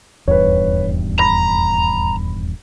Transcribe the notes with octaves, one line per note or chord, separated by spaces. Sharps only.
D#1 E2 G2 B4 C#5
A#5 B5 A#6